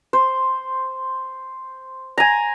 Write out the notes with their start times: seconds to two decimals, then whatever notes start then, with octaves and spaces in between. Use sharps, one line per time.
0.13 C5
2.18 G#5 A#5